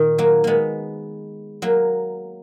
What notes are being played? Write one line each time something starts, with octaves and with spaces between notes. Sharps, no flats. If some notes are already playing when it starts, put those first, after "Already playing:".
Already playing: A#2 D#3
F#3 A#3
G#3 A#3 B3
F#3 A#3